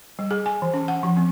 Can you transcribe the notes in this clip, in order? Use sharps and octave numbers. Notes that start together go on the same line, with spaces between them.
G3
G#4
G#5
E3
C#4
F#5
F3
C4